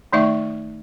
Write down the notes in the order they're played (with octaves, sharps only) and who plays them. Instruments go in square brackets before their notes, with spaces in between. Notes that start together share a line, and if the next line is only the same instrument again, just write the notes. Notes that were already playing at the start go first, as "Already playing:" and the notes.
[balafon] D#3 A3 D#4 D5 E5 C#6